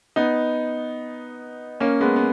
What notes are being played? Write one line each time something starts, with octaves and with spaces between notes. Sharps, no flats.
B3 D#4
A#3 C#4
G#3 B3
B3